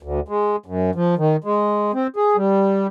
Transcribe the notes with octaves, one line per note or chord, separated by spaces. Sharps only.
D2
G#3
F#2
F3
D#3
G#3
C4
G#4
G3